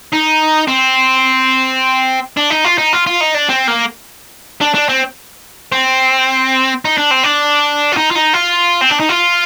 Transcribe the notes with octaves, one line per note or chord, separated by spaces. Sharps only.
D#4
C4
D4
D#4
F4
D#4
F4
F4
D#4
D4
C4
A#3
D4
D4
C4
C4
D#4
D4
C4
D4
F4
D#4
F4
D#4
F4
C4
D4
D#4
F4